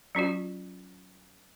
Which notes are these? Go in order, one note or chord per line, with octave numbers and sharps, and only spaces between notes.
F#3 C#4 F4 F#4